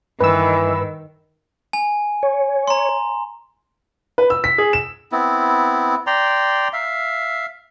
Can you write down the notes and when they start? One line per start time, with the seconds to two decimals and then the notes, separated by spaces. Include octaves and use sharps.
0.20 G2 D#3 E3 B4 E6
1.73 G#5
2.23 C#5
2.67 A#5 C6
4.18 B4
4.30 E6
4.44 B6
4.58 G#4
4.73 E7
5.12 B3 C4 E4
6.07 D5 G5 A#5 C6
6.73 E5 F5